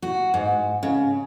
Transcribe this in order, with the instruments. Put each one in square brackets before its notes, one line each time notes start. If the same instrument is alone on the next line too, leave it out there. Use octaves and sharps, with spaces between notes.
[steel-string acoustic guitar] F#4
G#2
C#3